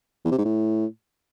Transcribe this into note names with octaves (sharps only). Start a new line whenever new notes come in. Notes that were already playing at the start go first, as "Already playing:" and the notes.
E2
C3
G#2
A2